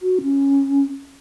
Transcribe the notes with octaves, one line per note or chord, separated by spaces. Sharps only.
F#4
C#4